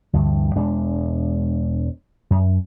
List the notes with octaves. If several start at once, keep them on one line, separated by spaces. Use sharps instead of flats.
D2 G2 D3 E3
E1 G#3 D4
F#2